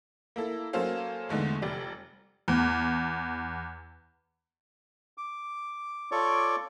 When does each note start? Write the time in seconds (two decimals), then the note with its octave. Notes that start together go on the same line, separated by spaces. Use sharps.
0.36 A#3 E4 A4
0.73 F#3 A#3 C#4 A4 C5 F5
1.29 E2 D3 G#3 A3
1.62 F1 G3 D5
2.48 E2
5.18 D6
6.11 F4 A4 C#5 D5 C#6 D6